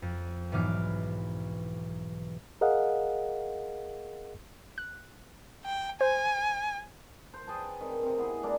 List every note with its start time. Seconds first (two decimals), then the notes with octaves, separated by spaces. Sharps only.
0.02 F2
0.52 B1 G#2 E3 B3 D6 F6
2.61 G#4 A#4 D#5 F5 F#5
4.78 F#6
5.64 G5
6.01 C5 G#5
7.34 C5
7.47 G#4 B4 G5 A5
7.80 D#3 C4
8.03 C3 C4
8.18 B3 E4 G#4
8.43 A3 A#3 D4 E4